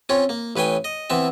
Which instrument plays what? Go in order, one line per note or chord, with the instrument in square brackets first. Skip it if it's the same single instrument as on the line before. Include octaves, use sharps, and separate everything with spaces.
[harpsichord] C4 C#4 F4 C#5
A#3
A1 B4 C#5 G5 G#5
D#5
E3 B3 C4 E5